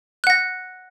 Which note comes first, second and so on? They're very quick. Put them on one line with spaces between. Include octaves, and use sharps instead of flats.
F#6 F#5 A#6